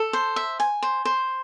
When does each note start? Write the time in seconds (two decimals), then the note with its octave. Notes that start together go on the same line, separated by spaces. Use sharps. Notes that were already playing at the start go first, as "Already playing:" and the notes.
Already playing: A4
0.13 C5
0.36 E5
0.60 G#5
0.83 C5
1.05 C5